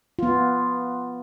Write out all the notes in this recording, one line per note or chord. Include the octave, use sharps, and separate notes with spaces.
B3 F4